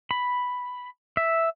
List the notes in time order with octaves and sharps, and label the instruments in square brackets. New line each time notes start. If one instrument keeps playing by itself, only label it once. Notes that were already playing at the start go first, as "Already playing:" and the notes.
[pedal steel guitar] B5
E5